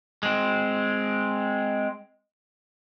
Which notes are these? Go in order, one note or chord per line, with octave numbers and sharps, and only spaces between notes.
G#3 C4